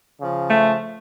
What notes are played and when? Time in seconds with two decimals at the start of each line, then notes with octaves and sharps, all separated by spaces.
0.20 C#3 F3
0.49 A3